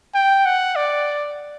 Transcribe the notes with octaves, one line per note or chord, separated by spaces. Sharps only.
G5
F#5
D5